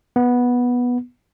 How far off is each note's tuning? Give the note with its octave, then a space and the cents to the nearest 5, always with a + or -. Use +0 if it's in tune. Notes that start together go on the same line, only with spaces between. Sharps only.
B3 -10